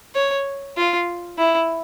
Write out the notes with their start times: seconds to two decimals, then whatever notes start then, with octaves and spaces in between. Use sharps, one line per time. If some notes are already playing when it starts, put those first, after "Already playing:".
0.15 C#5
0.77 F4
1.38 E4